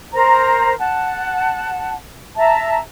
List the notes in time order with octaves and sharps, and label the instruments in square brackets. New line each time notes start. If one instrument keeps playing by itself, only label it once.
[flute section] A#4 C5 A#5
F#5 A5
E5 A5 A#5